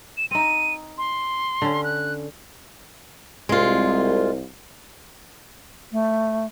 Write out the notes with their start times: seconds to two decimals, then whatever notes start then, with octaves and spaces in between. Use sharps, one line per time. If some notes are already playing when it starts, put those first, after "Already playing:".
0.17 E7
0.31 C4 D#4 D#7
0.98 C6
1.62 D3 C#4
1.84 F#6
3.49 C2 G#3 F4
5.92 A3